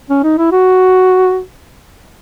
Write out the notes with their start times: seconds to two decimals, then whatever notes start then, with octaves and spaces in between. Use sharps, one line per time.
0.10 C#4
0.23 D#4
0.38 E4
0.52 F#4